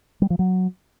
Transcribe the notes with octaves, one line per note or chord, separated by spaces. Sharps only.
G3
F3
F#3